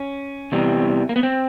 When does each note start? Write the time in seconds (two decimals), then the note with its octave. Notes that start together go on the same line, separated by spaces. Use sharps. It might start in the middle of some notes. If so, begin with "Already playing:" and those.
Already playing: C#4
0.52 E2 C3 E3 G3
1.09 A#3
1.16 B3
1.23 C4